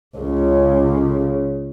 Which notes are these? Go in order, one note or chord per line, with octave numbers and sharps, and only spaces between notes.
C#2 C#3